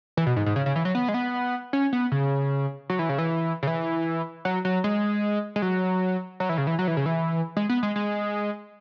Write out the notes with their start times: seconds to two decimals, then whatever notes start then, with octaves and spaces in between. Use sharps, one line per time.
0.17 E3
0.26 B2
0.36 G#2
0.46 G#2
0.56 C#3
0.66 C#3
0.76 E3
0.85 F#3
0.95 B3
1.08 G#3
1.14 B3
1.73 C#4
1.93 B3
2.12 C#3
2.90 F#3
2.99 E3
3.09 C#3
3.18 E3
3.63 C#3
3.67 E3
4.45 F#3
4.65 F#3
4.84 G#3
5.56 G#3
5.62 F#3
6.40 F#3
6.49 E3
6.58 C#3
6.67 E3
6.79 F#3
6.88 E3
6.97 C#3
7.06 E3
7.57 G#3
7.69 B3
7.83 G#3
7.96 G#3